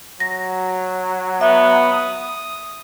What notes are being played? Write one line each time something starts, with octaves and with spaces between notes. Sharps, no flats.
F#3 A#6
B3 E5
D#6